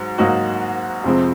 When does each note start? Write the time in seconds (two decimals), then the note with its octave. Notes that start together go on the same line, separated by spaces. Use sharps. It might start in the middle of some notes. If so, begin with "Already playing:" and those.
Already playing: G#2 F#3
0.18 G#2 F#3 A#3 D#4 F#4
1.04 F2 C3 F3 G#3 C4